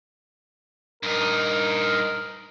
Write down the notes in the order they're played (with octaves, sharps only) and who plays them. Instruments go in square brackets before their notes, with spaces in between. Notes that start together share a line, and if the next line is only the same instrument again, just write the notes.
[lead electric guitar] G2 D#4 [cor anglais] A#4